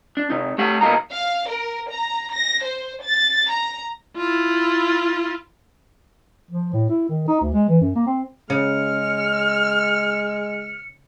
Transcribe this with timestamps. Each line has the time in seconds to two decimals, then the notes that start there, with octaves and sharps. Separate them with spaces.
0.17 D4
0.30 C3 D#4
0.58 A3 G4 F#5
0.81 B1 B2 A#3 D#4 A#5
1.11 F5
1.50 A#4
1.90 A#5
2.34 A#6
2.64 C5
3.04 A6
3.52 A#5
4.16 E4 F4
6.51 F3
6.73 A2
6.89 E4
7.09 D#3
7.28 D#4
7.41 D2
7.54 G#3
7.69 E3
7.81 F#2
7.95 A#3
8.07 C4
8.50 C#3 G#3 F6 C#7